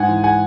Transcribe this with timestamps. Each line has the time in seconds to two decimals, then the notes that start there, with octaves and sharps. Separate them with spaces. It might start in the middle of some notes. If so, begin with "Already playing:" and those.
Already playing: G#2 F#5 G#5
0.08 E3
0.24 F#5 G#5